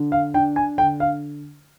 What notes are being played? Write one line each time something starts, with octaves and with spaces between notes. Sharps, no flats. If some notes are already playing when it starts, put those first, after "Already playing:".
Already playing: D3
F5
D4 G5
G#5
D3 G5
F5